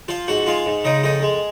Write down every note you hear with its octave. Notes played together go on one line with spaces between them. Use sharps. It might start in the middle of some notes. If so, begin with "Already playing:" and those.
F3 F4 F5
G#2 F#4 F#5
G#3 F4 F5
G#2
C#3 D#4 D#5
F2 D#4 D#5
G#3